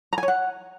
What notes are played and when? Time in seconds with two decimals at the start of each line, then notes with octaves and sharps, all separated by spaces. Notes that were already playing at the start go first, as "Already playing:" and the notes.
0.13 A#5
0.18 G#5
0.23 C#5
0.28 F#5